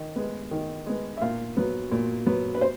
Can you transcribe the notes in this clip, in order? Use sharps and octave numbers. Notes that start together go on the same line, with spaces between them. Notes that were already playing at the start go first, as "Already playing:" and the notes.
Already playing: D#3
G#3 B3
D#3
G#3 B3
E5
A#2 F5
F#3 B3
A#2
F#3 B3
B4
C5